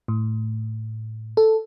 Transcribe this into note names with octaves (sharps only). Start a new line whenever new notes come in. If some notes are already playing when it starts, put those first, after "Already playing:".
A2
A4